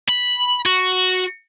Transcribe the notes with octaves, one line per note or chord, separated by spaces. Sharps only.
B5
F#4